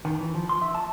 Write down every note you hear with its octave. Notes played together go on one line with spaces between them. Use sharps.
D#3
E3
F3
C6
E5
A5